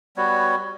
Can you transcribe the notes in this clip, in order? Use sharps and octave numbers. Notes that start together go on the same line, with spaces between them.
G3 B3 F#4 C#5